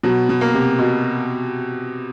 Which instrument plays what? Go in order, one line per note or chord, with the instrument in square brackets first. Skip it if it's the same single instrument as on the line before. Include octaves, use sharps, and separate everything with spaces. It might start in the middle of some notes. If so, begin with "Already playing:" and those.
[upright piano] B2 [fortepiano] F#3
[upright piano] B2
[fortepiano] A#3
[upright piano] C3
[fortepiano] B2